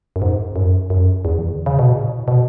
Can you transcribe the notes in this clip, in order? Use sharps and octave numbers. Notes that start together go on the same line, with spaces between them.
F#2
G#2
F#2
F#2
E2
E3
D3
C#3
B2
A2
B2